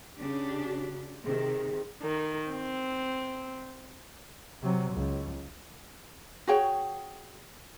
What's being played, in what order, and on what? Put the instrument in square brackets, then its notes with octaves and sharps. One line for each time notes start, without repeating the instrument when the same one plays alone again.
[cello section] C#3 D4 G4
[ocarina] F#4
[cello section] C3 D#3 [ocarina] G#4
[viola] D#3
C4
[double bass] C3 F#3
C#2
[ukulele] F#4 G#4 C#5 G5